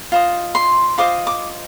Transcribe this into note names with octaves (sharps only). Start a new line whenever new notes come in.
F4 C5 D#5
C6
F4 C5 D#5 D6
D6